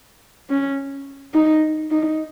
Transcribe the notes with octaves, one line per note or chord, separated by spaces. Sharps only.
C#4
D#4
D#4